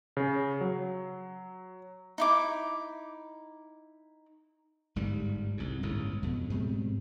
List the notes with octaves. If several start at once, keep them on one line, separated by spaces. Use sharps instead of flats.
C#3
F#3
D#4 E4 D6
G1 G#2 G3
C2 G#2
G1 C#2 A2 C#3
F2 B2
G#2 B2 G3 C4